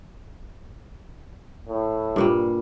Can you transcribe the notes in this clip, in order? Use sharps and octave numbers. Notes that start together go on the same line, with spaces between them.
A2
G2 A#2 G3